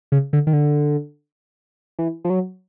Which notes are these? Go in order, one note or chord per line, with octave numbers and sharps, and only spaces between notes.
C#3
D3
D#3
D3
E3
F3
F#3